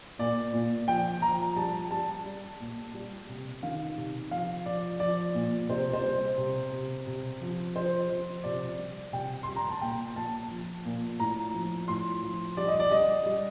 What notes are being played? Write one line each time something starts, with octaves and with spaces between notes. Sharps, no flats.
A#2 D5
A#2
F3 G5
F3 A#5
G3 A5
G3 A5
G3
A#2
G3
C3
D#3 F5
C3
F3 F5
F3 D5
F3 D5
A#2
C3 C5
C5
G3
C3
C3
C3
F3
F3 C5
F3
C3 D5
G3
C3 G5
G3 C6
A#5
A5
A#2 G5
A#2 A5
F3
A#2
A2 A#5
F3
A2 C6
F3
G3 D5
D#5
D5
G3 D#5
G3